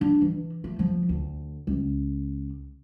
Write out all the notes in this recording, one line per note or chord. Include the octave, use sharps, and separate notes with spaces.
D4
E3
A3
F3
D2
C#2